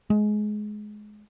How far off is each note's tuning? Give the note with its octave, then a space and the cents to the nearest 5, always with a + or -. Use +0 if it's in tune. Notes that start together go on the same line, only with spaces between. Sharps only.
G#3 +20